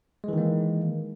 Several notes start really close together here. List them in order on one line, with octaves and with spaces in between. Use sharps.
G#3 E3 D#3 A#3